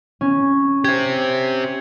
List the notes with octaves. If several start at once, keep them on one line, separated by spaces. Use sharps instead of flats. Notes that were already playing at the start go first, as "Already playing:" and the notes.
C#4
G4 C5 G#6